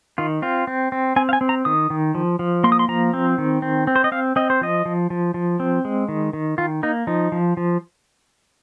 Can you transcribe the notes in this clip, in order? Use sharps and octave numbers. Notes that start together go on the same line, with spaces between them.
D#3 F4
C4 F4
C4
C4
C4 G#5
F5
G#5
C4
A#5
D#3 D#6
D#3
F3
F3
A#3 C6
D#6
C6
F3 A#5
C4
D#3
C4
C4
C5
D#5
C4 F5
C4 D#5
C5
F3 D#5
F3
F3
F3
C4
G#3
D#3
D#3
D#3 F4
A#3 D#4
F3 D#4
F3
F3